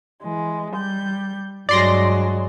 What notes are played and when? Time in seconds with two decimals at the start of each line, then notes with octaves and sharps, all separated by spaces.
0.23 E3 G#3
0.73 G3 G6
1.69 G2 F#3 G#3 D5 C6 A#6